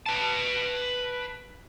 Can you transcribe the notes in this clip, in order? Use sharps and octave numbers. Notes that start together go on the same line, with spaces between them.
B4 A5